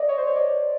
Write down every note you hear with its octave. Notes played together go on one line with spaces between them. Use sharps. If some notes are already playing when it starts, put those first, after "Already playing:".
Already playing: D5 D#5
C#5
C5
C#5
D5